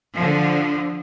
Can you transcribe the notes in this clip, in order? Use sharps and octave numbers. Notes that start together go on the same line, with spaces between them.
D3 F3